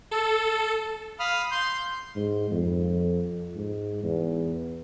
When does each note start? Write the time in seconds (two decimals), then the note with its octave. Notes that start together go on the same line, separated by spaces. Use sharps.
0.11 A4
1.20 F5 B5 D#6 F6
1.51 C6 G6
2.16 G#2
2.51 F2
3.55 G#2
4.03 E2